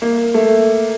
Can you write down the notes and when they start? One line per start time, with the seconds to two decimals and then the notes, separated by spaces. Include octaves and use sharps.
0.02 A#3
0.34 A3